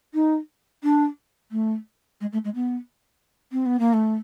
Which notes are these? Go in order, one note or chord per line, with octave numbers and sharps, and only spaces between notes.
D#4
D4
A3
G#3
A3
G#3
B3
C4
B3
A#3
A3